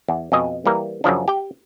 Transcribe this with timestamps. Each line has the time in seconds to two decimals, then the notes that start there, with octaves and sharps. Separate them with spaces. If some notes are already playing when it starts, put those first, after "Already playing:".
0.08 E2
0.32 F2 B2 D#5 G#5
0.66 E3 G3 A#3 A#4
1.04 F#2 C#3 F3 D4
1.28 G4 G5